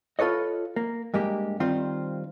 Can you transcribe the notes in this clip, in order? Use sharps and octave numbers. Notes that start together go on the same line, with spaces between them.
F4 A4 B4 C#5 D#5
A#3
G2 G#3 A#3 G4
D#3 G3 C4 F4 C5